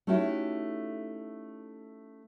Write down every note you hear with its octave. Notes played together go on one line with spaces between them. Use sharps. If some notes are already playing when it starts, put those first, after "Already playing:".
A3 C#4 D#4 E4 F#4 G4